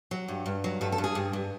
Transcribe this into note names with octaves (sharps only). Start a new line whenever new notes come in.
F#3
G2
G2
F#3
G2 A4
A4
G2
G#4
G2
G2